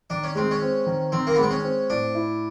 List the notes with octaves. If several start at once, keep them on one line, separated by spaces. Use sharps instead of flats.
D#3 D4
C#4
G#3 C4
C#4
C4
D#3
D#3 C4
A#3
B3
G#3
C4
C#4
C4
A2 D4
E4